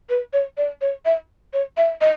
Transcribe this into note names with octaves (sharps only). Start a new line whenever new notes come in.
B4
C#5
D5
C#5
E5
C#5
E5
D#5